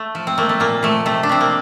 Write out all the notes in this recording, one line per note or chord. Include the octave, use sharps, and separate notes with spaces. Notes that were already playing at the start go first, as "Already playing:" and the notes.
Already playing: A3
F3
C4
A3 A#3
A3
A#2 A#3
F3 A3
C3 A3
D4
C3 C4
A#3